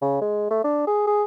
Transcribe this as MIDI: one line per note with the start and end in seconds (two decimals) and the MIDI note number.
0.02 0.17 49
0.21 0.50 56
0.51 0.61 57
0.64 0.85 62
0.87 1.03 68
1.07 1.24 68